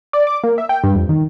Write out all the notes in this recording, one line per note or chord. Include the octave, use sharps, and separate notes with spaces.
D5
D6
A#3
E5
G5
G2
F2
D#3